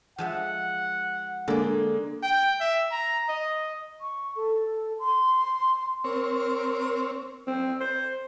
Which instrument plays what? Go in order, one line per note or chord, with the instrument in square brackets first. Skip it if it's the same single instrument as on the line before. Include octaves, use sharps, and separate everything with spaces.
[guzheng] F3 G#3 E5 [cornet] F#5
[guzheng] D3 D5 [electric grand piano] G#3 A#3 G#4
[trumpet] G5
E5
A#5
D#5
[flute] C#6
A4
C6
[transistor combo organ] C4 C#5 [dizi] A#4
[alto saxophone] C4
C5